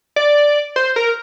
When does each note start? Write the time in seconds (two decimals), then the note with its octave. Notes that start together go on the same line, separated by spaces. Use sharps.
0.16 D5
0.76 C5
0.96 A#4